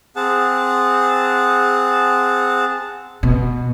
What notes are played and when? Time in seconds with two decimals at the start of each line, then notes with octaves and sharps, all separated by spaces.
0.16 C4 G#4 F#5 A5
3.23 B2